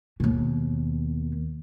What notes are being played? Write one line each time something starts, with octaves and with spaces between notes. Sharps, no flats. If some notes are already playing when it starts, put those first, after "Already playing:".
D#2 B2